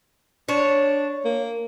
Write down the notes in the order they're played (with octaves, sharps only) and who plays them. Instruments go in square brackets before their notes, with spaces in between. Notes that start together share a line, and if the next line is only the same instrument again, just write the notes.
[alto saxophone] D4 [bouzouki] C#5
[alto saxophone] A#3